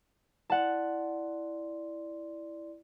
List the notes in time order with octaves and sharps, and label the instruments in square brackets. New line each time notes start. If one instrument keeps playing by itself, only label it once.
[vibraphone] E4 D5 C6 [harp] F#5 A5